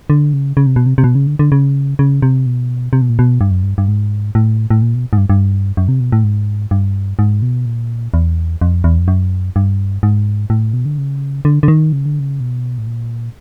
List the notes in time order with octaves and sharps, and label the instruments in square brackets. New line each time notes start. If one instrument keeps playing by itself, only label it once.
[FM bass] D3
C#3
C#3
C3
B2
C3
C3
B2
C#3
D3
D3
C#3
C#3
C3
B2
C3
B2
A#2
B2
G2
F#2
G2
G2
G#2
A2
A2
A#2
B2
G#2
G2
G2
F#2
C3
B2
A2
G#2
G2
G#2
B2
A#2
E2
F2
E2
F2
F#2
G2
G#2
A2
B2
D3
C#3
D3
D3
D#3
C#3
D3
C#3
B2
A2
A#2